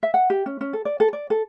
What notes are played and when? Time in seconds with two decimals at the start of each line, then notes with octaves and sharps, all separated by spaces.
0.03 E5
0.14 F#5
0.30 G4
0.46 C#4
0.61 C#4
0.73 A4
0.85 D5
1.00 A4
1.13 D5
1.30 A4